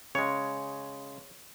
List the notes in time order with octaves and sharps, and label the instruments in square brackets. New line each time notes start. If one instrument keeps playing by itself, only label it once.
[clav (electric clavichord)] C#3 G#3 C#5